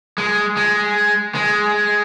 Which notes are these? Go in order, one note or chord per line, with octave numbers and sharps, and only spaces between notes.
G#3
G#3
G#3